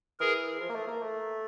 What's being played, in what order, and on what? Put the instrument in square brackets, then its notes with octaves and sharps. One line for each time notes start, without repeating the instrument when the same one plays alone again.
[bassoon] E3 [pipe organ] G#4 A#4
[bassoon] F3
A#3
A3
A#3
A3